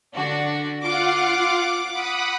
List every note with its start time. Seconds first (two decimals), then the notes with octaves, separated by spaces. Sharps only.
0.14 D3 D4 F#4
0.82 F4 F5 F#5 D6
1.92 F#5 B5 D#6